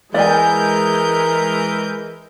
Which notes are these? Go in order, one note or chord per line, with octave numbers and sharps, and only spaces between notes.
E3 G#3 A#4 D5 D#5 G#5 G6